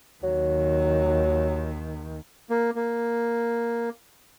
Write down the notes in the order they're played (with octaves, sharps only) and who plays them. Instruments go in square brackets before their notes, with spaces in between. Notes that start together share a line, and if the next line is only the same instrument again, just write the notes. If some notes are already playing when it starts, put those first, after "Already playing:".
[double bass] D#2 D#3 [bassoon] F#3
[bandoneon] A#3
A#3